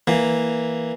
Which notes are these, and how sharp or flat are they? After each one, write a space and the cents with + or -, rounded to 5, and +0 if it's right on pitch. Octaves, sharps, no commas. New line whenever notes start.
E3 +0 A#3 +0